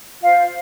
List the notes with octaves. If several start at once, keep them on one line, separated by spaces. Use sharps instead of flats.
F4 C5 F5